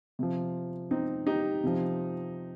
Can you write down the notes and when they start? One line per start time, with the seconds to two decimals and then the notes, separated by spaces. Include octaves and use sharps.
0.19 C3 F3
0.91 C4 D#4
1.27 D#4 G4
1.63 C3 F3